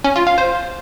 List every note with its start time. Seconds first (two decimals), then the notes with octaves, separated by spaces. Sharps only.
0.04 C#4
0.16 F4
0.27 F5
0.38 C5